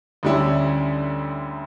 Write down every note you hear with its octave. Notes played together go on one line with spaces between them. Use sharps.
D2 D3 G3 C#4 E4